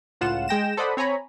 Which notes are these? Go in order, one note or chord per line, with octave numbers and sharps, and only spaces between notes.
C#2 A2 F4 F#5 E7
G#3 G5 A#6 E7
A4 C5 D5 D#5 F#5 B5
C4 C#5 G#5 A#5 B5